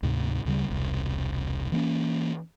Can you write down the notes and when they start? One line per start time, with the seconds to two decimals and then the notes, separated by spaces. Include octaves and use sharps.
0.03 D2 G#2 C3
0.45 D2 C#3 G3
0.68 E1 C2
1.72 E3 A#3 C4 C#4